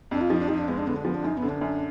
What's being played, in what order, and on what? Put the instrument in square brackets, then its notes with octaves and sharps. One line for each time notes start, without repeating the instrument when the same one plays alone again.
[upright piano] F2 [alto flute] D4
[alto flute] F4
[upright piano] F3 [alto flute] D#4
[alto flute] D4
[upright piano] F3 [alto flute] D#4
[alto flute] D4
[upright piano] G#3 [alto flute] B3
[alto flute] D4
[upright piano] D3 [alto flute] B3
[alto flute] D4
[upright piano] F3 [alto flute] B3
[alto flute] D4
[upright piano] F#2 [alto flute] D#4
[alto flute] B3
[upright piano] D3
[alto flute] D4
[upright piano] F#2